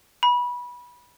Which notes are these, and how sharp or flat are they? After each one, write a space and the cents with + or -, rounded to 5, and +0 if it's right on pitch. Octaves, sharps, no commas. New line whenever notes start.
B5 -20